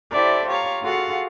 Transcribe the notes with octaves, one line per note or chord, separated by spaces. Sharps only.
E4 G4 A4 C5 D5 E5
F4 G4 C#5 F5 A#5
F4 F#4 G#4 A4 F5 F#5